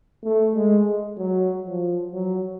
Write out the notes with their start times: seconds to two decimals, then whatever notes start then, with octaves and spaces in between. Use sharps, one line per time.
0.24 A3
0.55 G#3
1.18 F#3
1.66 F3
2.12 F#3